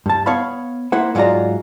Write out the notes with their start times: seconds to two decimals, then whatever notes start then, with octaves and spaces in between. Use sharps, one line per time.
0.06 G2 A5
0.26 B3 C#5 F5 B5
0.92 A#3 E4 C5 F#5
1.15 G#2 F#3 F4 G4 D5 A#5